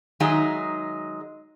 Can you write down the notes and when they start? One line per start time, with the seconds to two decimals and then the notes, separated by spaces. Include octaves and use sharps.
0.20 D#3 F#3 G#3 D#4 G#4 E5